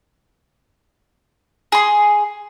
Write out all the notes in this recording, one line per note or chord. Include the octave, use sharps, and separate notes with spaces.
G#4 C6